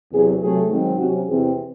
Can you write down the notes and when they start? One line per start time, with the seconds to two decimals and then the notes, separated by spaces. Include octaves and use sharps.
0.11 E2 C3 F#3 G#4
0.41 C3 F#3 A3 G#4
0.69 G#2 D#3 F#3 C4
0.98 C3 F#3 C#4 F#4
1.28 E2 C3 E3 C4 G#4